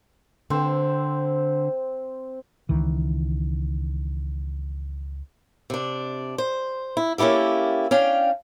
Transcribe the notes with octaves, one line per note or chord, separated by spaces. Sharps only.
D3 C4 C5
C#2 D#3 E3
C3 D4
C5
E4
A#3 C#4 E4 G4 A4
C#4 D4 F5 G5